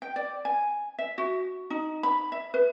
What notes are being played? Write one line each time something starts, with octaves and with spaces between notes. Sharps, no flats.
G5
D5
G#5
E5
F#4
D#4
B5
E5
B4